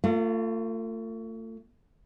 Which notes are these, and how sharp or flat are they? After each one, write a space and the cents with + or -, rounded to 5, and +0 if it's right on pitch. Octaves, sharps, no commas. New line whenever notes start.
A3 +40 F4 +0